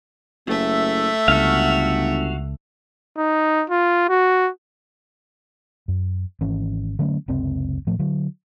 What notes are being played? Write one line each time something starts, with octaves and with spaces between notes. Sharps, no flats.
F#1 A3 E5
G1 C#2 F#4 F5
D#4
F4
F#4
F#2
G#1 E3 C#4
D3 F#3 A3 C#4
F#1 C#2 C3 C4
A2 F3 A3
D3 F#3